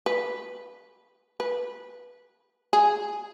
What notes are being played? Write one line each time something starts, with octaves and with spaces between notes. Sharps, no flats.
B4
B4
G#4